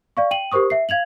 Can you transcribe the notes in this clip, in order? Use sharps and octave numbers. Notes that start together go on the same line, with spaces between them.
D5 F5 C#6
G5 D#7 F#7
G4 A#4 C5 C#6 D#6
E5 C7
F5 G#6 F7 F#7